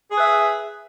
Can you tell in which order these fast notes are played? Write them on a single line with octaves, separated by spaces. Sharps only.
G#4 B4 E5